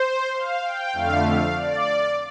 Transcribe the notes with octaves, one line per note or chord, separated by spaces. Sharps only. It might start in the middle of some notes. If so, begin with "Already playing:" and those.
Already playing: C5
F5
G5
F2 D3 A3 F5
F5
D5